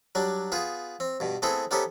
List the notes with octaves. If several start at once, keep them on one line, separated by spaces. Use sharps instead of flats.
F#3 G3 D4
B3 F4 G#4
C4
G2 B2
A3 B3 C4 E4 G#4 A4
B3 C#4 D#4 G4 A4 C5